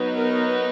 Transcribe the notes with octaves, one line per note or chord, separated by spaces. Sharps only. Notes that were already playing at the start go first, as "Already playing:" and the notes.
Already playing: F#3 B3 D#4
A#4